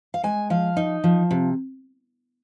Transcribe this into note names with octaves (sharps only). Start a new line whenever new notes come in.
F5
G#3 G#5
F3 F5
D#4
F3
C3